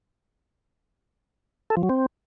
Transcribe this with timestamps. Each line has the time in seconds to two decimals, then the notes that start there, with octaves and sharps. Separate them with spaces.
1.70 A4
1.77 F3
1.83 F#3
1.89 C4